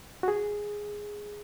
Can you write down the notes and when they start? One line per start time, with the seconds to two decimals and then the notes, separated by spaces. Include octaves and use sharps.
0.23 F#4
0.28 G#4